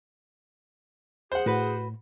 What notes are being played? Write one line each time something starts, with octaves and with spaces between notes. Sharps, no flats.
G#4 C5 F#5
A2 F#4 B4